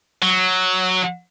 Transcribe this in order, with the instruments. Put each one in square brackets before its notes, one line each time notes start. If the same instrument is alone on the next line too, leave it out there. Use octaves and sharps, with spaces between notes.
[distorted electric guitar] F#3